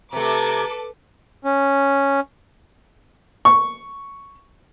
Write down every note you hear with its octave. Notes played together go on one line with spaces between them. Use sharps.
C3 A3 A4 B4 A#5 D6
C#4
C#6